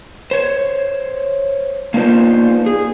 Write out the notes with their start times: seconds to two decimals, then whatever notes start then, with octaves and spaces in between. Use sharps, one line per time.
0.31 C5 C#5
1.94 A#3 B3 D4 D#4 F4 C5
2.66 G#4